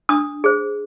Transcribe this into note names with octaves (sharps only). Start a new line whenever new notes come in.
D4 D#6
G#4 C5